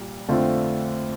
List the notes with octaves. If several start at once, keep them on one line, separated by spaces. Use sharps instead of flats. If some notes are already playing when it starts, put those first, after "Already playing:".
Already playing: A#2 G3
F2 D3 A3 C4 F4